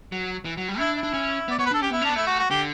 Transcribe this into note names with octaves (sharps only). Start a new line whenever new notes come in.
F#3
E3
F#3
G3
D4 E4
E4
D4
C#4
B3
D5
B3 C#5
B4
D4 A4
C#4 G4
B3 E4
C#4
D4
B3
A3 E4
F#4
F#4
D3 G4